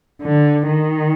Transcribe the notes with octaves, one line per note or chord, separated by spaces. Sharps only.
D3
D#3